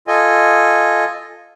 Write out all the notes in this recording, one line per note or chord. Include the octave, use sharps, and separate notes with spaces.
F4 A4 D#5 G#5